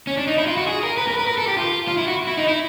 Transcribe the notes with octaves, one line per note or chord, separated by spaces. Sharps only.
C#4
D4
D#4
E4
F4
F#4
G#4
A#4
B4
A#4
B4
A#4
A4
G4
F4
F4
E4
F#4
E4
D#4
E4